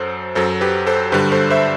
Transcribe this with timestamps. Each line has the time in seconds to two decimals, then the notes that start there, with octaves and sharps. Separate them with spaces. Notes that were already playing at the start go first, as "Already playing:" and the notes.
Already playing: F#2 F#3 A4 C5
0.35 F#2 F#3 A4 C5
0.61 G4 B4
0.87 A4 C5
1.12 G2 D3 G3 G4 B4
1.32 A4 C5
1.50 C5 E5